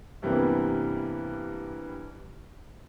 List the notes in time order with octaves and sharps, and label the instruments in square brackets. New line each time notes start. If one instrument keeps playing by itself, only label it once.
[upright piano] G2 C3 E3 G3 A#3 B3